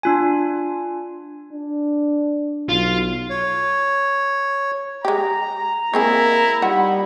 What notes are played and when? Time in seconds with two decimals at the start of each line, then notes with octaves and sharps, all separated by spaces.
0.03 D4 F4 G#5
1.52 D4
2.69 B1 F4
3.30 C#5
5.05 G#3 G4 A#5
5.94 G#3 A#3 C4 E4 G#4
6.62 G3 D#4 F4 F#5 B5